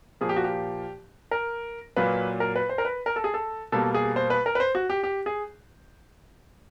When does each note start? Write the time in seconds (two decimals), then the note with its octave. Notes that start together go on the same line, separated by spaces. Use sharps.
0.21 A#2 F3 A#3 G#4
0.29 G4
0.36 F#4
0.44 G4
1.31 A#4
1.96 A#2 F#3 A#3 B4
2.40 A#4
2.56 B4
2.69 C5
2.78 A#4
2.85 B4
3.06 A#4
3.16 A4
3.24 G#4
3.34 A4
3.72 B2 G3 A#3 A4
3.94 G#4
4.16 C5
4.30 B4
4.46 A#4
4.55 B4
4.60 C5
4.75 F#4
4.90 G4
5.04 G4
5.26 G#4